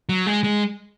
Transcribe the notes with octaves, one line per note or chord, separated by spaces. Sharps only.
F#3
G#3
G#3